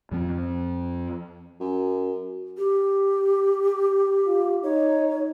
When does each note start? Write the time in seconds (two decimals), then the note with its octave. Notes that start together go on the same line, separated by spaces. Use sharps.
0.11 F2 F3 C4
1.60 F#2
2.57 G4
4.26 F4
4.63 D#4 C#5